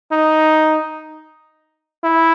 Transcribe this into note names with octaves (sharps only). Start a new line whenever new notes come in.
D#4
E4